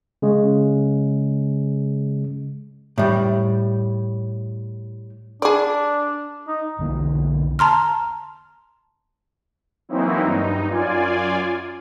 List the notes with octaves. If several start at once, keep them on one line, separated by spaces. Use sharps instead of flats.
C#3 G#3
A2 G3
D4 G#4 D5
D#4
B1 E2 D3 A#3
A5 A#5 C6 F6
E3 F#3 A#3 C4 D#4 E4
G2 D#4
F#2 F4 D5 G#5